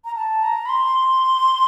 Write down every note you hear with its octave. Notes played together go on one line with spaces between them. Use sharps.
A#5
A5
A#5
B5
C6